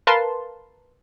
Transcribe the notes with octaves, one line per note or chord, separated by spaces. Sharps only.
A#4 B4 F5 A5 C6